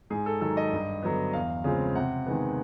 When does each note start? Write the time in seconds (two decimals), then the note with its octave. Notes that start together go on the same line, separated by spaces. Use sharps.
0.10 G#2 G#4
0.26 A4
0.41 D#3 F#3 A4
0.57 D#5
0.72 G2
1.02 D3 F#3 B3
1.33 E2 F5
1.64 C#3 F3 G#3 C4
1.95 C3 F#5
2.26 D#3 G#3 B3